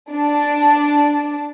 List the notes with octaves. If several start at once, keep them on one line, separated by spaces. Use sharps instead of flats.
D4